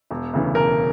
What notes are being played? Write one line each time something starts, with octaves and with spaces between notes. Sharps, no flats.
E1
D2 C#3 E3
E1 A#4